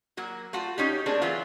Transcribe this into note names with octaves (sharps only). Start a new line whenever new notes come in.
F#3 A#3 F#4
A3 F4 F#4
C#4 D#4 G4
A3 A#3 C4 D4 G#4
E3 F#3 B3 F4